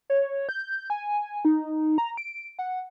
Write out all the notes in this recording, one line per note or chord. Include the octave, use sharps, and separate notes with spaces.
C#5
G6
G#5
D#4
A#5
D7
F#5